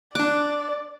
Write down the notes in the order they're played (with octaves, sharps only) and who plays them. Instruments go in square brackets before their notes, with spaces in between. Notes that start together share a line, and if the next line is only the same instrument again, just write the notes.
[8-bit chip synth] D4 F#6 [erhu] D5 [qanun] D6